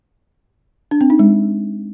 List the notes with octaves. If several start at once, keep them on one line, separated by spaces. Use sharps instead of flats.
D4
C4
D#4
G#3